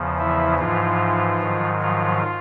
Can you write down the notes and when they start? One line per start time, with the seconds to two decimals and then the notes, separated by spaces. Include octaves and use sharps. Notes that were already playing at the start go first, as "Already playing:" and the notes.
Already playing: E2 C#3 F3
0.19 E3 E4
0.59 G#2 E3 F3 F4
1.41 G#2 D#3 F#3
1.82 F3 F4